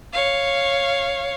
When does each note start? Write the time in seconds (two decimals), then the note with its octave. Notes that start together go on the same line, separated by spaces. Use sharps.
0.13 C#5 F5